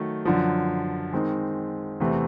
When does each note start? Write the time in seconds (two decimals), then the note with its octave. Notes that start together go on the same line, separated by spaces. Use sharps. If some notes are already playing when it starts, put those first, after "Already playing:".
Already playing: D#3 F#3 A3
0.25 F#2 D3 F3
1.12 D#3 G#3 C4 D#4
2.00 E2 C3 E3 A3 C4